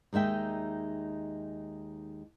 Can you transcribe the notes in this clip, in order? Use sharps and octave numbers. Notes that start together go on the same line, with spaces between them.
D#2 G#3 D#4 E5 G5